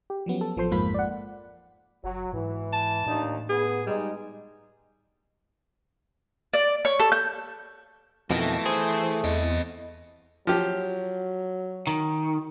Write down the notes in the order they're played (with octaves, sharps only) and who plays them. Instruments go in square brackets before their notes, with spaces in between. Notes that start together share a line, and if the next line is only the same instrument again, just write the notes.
[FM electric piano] G4
F3 F#3 B3 C#4
A4
A1 F3 A4 C5 C6
F2 G#2 A#3 F4 B5 B6
D5 F#5
[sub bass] F#1 [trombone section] F#3
[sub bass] G#2 [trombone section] E3
[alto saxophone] A5
[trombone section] D#2 D4 D#4 [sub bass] A2
[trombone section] B3 [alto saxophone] G#4
[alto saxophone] G3 [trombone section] G#3 D#4
[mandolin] D5
C#5
A4
G6
[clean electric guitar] F2 B2 D#3 [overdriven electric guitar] E3 [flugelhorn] A3 [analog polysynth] A#6
[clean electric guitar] G#4 [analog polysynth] C5
[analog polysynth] E2 [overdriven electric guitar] C4 D#5
[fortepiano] F3 G4 [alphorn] F#3
[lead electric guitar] D#3